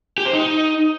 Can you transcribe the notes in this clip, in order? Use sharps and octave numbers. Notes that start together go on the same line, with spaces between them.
G4
C5
D#4